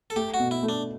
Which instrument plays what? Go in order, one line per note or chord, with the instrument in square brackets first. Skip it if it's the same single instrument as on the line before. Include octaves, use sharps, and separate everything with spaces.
[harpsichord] A4
[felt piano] A3 [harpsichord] G4
[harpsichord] F#4
[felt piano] B2
[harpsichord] E4
[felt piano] A3
[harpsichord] D4